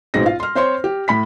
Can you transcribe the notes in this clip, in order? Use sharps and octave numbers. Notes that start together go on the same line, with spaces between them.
A1 G#2 B2 G#3 C4 A#6
F4 F5
C6 F6
C4 C5 C#5 C6
G4
A2 B5 B6